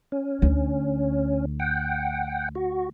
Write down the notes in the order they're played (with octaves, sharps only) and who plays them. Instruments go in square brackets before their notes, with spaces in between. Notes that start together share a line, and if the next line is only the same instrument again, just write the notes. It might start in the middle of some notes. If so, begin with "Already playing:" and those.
[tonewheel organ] C#4
[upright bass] D2
[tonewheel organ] F#5 G5
F#4